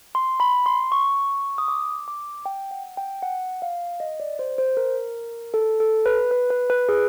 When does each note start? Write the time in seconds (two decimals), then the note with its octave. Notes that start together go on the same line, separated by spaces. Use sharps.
0.15 C6
0.40 B5
0.66 C6
0.92 C#6
1.58 D#6
1.68 D6
2.08 D6
2.46 G5
2.71 F#5
2.97 G5
3.22 F#5
3.62 F5
4.00 D#5
4.20 D5
4.39 C5
4.58 C5
4.77 A#4
5.54 A4
5.80 A4
6.06 B4
6.31 B4
6.50 B4
6.70 B4
6.89 G#4